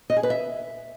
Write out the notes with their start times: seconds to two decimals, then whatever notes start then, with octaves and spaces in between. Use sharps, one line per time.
0.10 D#5
0.16 G#4
0.23 B4
0.30 E5